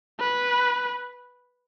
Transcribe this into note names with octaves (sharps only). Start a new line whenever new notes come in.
B4